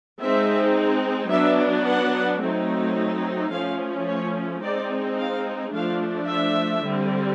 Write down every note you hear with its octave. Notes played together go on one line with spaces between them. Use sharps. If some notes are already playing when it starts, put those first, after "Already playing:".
G#3 C4 D#4 E5
F#3 B3 D4 E5
F#5
F#3 A3 C4 D#4
F3 A3 C#4 F5
C#5
G#3 C4 D#4 D5
F5
F3 A3 D4 F5
E5
D3 G3 C4